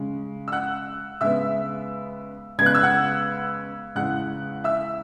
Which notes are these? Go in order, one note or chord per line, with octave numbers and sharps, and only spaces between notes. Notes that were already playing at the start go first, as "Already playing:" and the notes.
Already playing: C#3 G#3 C#4
E6
F#5 F#6
C#3 G#3 B3 E5 E6
C#3 G#3 B3 G#6
F#6
E6
F#5 F#6
E2 C#3 G#3 F#5 F#6
E5 E6